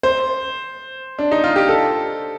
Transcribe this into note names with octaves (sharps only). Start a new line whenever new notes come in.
C5
D4
D#4
F4
G4
A4